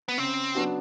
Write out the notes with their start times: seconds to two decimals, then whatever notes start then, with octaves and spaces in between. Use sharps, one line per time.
0.08 B3
0.18 C#3 C4
0.55 F#3 B3 D4 F#4